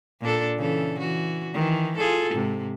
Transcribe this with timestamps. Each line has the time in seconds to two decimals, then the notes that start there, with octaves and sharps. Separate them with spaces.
0.21 A#2 D4 A4
0.57 C#3 E3 A4
1.00 E3 F#4
1.54 D#3 E3
1.98 F4 G#4 A4
2.33 G#2 C3